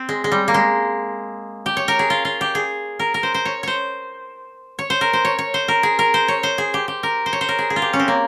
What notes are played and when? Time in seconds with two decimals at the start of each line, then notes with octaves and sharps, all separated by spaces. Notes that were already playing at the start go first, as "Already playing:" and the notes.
Already playing: C4
0.09 G#3
0.24 G#3
0.32 G3
0.48 A#3
0.54 G#3
1.66 G4
1.77 C#5
1.88 A#4
1.99 G#4
2.10 F4
2.25 F4
2.41 G4
2.55 G#4
2.99 A#4
3.14 A#4
3.23 C5
3.34 C5
3.45 C#5
3.63 C5 C#5
4.79 C#5
4.90 C5
5.01 A#4
5.13 C5
5.25 C#5
5.39 C#5
5.54 C5
5.68 A#4
5.83 G#4
5.99 A#4
6.14 C5
6.28 C#5
6.43 C5
6.58 G#4
6.74 G4
6.88 G4
7.03 A#4
7.26 C5
7.33 C#5
7.41 C5
7.49 A#4
7.59 G#4
7.70 G#4
7.76 F4
7.82 G4
7.93 C#4
7.99 C4
8.08 A#3